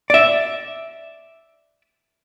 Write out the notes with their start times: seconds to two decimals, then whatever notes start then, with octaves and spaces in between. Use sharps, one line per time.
0.10 D5 E5